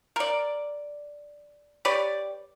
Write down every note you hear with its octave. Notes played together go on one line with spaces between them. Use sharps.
A#4 D5
G4 B4 C#5 D5